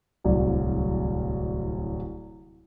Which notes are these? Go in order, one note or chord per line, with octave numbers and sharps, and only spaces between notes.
D1 C2 F#3 D5